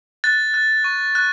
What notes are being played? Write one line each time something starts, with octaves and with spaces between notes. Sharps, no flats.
F#6 A6
F#6
C#6
F#6